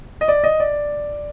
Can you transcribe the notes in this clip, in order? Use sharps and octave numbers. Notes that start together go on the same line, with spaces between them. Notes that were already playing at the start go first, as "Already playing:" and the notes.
D#5
D5
D#5
D5